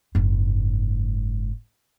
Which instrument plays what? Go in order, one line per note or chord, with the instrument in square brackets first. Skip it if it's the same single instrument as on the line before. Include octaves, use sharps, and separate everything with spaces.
[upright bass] F#1 G#2